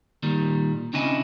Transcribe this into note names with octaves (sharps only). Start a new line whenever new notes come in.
A#2 D#3 G3
C#3 C4 D4 E4 D#5 G#5